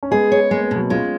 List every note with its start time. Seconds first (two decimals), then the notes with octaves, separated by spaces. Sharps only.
0.03 C#4
0.11 G#3 B3 G#4
0.32 C#5
0.51 G#3 A#3
0.64 B3
0.71 B2 F#3 A#3
0.90 G#3 C#4 F4